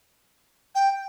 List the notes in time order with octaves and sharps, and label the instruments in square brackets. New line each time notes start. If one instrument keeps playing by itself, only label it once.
[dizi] G5